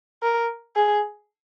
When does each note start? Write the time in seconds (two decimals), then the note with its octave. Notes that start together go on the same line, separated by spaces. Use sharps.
0.23 A#4
0.76 G#4